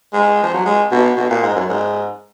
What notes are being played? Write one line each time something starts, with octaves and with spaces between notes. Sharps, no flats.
G#3
F3
F#3
G#3
B2
B2
A#2
G#2
F#2
G#2